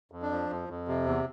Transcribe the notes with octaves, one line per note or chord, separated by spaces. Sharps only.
F2
D4
F3
F2
F2
C3
E2